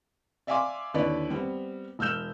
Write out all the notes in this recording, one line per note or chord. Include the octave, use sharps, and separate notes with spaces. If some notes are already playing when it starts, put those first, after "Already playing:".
D5 E5 F5 G#5 C6 D6
D#2 D3 E4 B4 C#5 D5
G3 B3 C4
E1 E6 F6 G6 E7